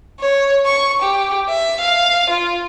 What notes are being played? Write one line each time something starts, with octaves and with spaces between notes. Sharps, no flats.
C#5
C#6
G4
E5
F5
F4